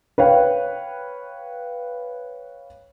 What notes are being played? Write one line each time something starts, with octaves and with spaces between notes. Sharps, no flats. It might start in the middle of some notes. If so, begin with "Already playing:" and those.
B4 C#5 F5 G5